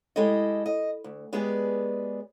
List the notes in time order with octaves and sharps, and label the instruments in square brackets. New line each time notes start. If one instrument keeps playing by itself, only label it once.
[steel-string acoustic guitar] G#3 E4 G4 A4 D#5
D#5
D2
G#3 B3 G4 G#4 B4 D5